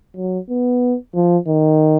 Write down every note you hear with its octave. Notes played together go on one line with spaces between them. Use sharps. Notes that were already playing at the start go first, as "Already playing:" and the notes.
F#3
B3
F3
D#3